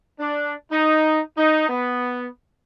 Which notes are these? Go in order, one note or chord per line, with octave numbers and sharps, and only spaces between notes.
D4
D#4
D#4
B3